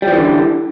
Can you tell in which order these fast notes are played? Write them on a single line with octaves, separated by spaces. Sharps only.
G3 F3 E3 D3